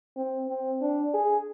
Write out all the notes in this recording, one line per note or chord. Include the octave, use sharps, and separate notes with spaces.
C4
C4
D4
G#4